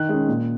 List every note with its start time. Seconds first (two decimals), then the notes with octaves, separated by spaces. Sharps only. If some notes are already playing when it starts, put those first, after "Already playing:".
Already playing: D#3 F#6
0.09 G#3 C#4
0.28 A#2